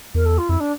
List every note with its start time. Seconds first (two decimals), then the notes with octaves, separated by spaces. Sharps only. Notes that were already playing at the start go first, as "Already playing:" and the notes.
0.14 E2 A#4
0.25 A4
0.38 F4
0.49 F2 E4
0.60 D4